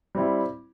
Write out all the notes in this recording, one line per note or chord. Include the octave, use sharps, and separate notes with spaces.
G3 C4 E4